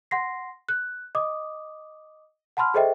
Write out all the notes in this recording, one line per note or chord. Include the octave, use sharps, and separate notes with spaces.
F#5 C6 A#6 C7
F#6
D#5 D6 D#6
F#5 A5 B5 C6 F6
G#4 A4 C5 D#5 E5 G5